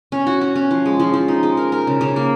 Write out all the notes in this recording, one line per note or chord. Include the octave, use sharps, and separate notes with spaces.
C#4
F#4
F#4
C#4
F3
G#3
F3
F3
D#4
G#3
A#4
A#4
C#3
C#3
A#3